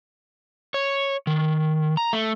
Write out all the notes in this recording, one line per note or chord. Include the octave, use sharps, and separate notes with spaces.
C#5
D#3
A#5
A3